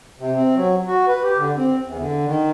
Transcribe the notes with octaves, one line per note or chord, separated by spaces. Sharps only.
C3
C4
F#3
F#4
B4
G4
D3
C4
E2
D3
D#3